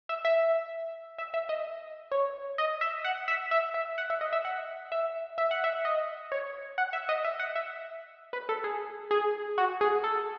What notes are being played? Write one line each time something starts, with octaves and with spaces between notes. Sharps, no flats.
E5
E5
E5
E5
D#5
C#5
D#5
E5
F#5
E5
E5
E5
F#5
E5
D#5
E5
F#5
E5
E5
F#5
E5
D#5
C#5
F#5
E5
D#5
E5
F#5
E5
B4
A4
G#4
G#4
F#4
G#4
A4